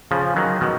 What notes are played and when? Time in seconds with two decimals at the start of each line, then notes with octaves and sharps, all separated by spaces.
0.11 C#3 F3
0.36 D#3 F#3
0.61 B2 D#3